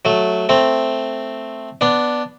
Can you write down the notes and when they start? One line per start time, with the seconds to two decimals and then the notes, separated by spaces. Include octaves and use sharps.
0.05 F#3 A3
0.49 A3 C4
1.81 B3 D4